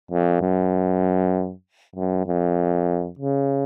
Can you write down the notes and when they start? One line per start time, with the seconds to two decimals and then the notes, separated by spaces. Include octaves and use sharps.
0.11 F2
0.41 F#2
1.96 F#2
2.26 F2
3.19 C#3